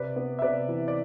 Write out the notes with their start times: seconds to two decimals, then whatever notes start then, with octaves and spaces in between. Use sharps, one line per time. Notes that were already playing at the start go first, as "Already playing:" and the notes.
Already playing: C3 B4 D5
0.16 B3
0.39 E5
0.42 C3 B4 D5
0.68 E3
0.88 D5